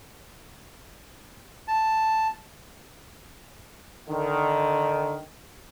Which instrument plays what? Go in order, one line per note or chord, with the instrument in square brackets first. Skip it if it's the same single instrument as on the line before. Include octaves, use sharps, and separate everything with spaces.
[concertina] A5
[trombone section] D3 D#3